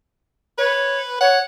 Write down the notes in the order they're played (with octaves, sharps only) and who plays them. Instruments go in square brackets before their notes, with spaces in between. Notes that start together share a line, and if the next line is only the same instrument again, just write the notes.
[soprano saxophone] B4 [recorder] C#5
[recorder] C#5 [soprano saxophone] F#5